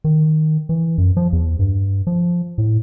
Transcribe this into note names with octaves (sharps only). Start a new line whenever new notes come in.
D#3
E3
F#2
F3
E2
G2
F3
A2